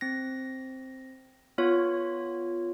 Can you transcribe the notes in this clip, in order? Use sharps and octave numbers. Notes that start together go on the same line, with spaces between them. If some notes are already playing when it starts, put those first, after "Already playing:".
C4 A#6
B3 F4 C#5